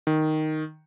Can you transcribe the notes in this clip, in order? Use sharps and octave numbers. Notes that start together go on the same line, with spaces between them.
D#3